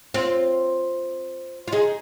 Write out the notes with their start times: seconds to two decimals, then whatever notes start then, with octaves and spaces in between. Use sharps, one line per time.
0.14 C4 F4
1.68 F4
1.72 D#4 G#4